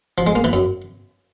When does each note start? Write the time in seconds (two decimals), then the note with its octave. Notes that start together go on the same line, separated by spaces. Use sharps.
0.18 F3
0.27 G#3
0.35 A#3
0.44 E3
0.53 F#2